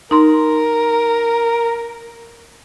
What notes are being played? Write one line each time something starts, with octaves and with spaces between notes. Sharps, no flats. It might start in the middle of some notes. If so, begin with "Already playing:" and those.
D#4 A#4 C6